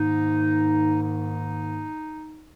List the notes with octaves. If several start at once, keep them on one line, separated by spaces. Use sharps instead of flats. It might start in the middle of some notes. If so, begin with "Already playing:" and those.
Already playing: G#2 D#3 A#3 D#4
D#4